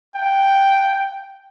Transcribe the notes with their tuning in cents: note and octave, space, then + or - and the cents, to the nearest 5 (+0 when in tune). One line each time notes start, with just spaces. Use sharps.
G5 +0